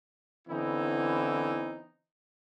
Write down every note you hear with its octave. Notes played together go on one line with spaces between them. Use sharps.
D3 E3 B3 C4 D#4 E4